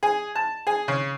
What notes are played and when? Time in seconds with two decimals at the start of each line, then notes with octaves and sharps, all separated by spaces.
0.03 G#4
0.35 A5
0.67 G#4
0.88 C#3